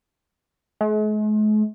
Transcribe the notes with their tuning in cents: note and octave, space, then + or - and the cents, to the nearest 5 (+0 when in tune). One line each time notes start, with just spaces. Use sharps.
G#3 +45